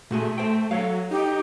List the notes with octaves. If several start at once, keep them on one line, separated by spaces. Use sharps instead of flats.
A#2 A3 F#4 G#4
C5 G5
F#3 A4 C#5 F5
D#4 G4